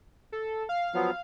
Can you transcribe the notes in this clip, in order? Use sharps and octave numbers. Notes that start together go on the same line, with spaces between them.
A4
F5
F3 F#3 B3